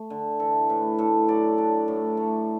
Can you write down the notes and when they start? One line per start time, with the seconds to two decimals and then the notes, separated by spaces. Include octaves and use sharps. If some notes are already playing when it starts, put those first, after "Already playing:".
Already playing: A3
0.10 D3
0.40 E3 A4
0.69 A2 B4
0.99 A2 A4
1.28 F#3 D5
1.58 D4
1.88 A2
2.17 A3